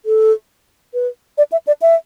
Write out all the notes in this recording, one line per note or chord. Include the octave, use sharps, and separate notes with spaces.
A4
B4
D5
E5
D5
E5